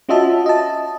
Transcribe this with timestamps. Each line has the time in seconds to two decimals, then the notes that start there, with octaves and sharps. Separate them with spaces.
0.09 C#4 F4 F#4 D#5 E5 A5
0.46 D#5 A5